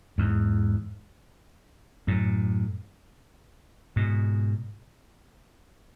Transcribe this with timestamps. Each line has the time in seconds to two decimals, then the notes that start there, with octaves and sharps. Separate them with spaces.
0.18 E2 G#2
2.07 F#2 A2
3.96 G#2 B2